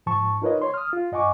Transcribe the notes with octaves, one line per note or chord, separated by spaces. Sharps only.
G#2 F3 A5 C#6
D#4 F4 A#4 B4 C#5 D#5
C#5 C6
D#6 F6
F4
G2 D#5 F#5 G#5 C#6 D6